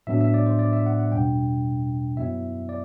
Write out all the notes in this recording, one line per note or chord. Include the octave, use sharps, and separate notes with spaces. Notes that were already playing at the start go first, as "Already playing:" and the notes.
A2 F#3 B3 D4 E5
E5
D5
C5
D5
E5
F#5
F#5
E2 B2 G3 D4 G5
F#2 F#3 B3 E4 E5
D5